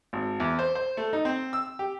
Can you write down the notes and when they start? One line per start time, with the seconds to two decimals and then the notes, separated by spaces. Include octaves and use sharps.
0.13 G#1
0.40 E2
0.59 C5
0.75 C5
0.97 A3
1.13 D#4
1.25 C4
1.53 E6
1.79 G4